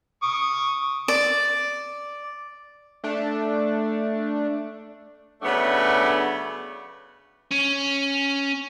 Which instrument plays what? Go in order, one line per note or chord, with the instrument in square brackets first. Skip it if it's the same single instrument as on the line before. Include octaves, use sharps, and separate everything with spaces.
[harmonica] C#6 D#6
[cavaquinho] D5
[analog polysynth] A3 D4
[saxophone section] C#3 F#3 A3 B3 D4
[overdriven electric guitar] C#4